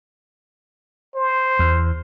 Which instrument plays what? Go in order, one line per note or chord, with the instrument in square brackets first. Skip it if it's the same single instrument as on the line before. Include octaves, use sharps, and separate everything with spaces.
[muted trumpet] C5
[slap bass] E2